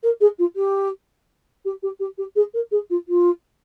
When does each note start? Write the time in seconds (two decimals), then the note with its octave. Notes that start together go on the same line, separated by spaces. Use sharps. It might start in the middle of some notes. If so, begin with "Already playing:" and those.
0.03 A#4
0.21 G#4
0.39 F4
0.56 G4
1.65 G4
1.83 G4
2.00 G4
2.18 G4
2.36 G#4
2.54 A#4
2.71 G#4
2.90 F4
3.08 F4